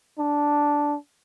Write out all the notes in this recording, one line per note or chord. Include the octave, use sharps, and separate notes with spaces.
D4